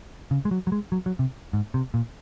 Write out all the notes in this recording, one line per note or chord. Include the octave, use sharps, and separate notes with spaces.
C#3
G#3
F#3
F#3
G#3
F#3
F#3
C3
G#2
C3
A#2